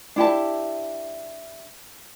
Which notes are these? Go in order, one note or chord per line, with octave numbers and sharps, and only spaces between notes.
D4 E4 G4 A5